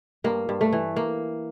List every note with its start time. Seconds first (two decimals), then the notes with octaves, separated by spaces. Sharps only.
0.24 G2 A#3
0.49 G2
0.61 A3
0.73 E3
0.96 A#3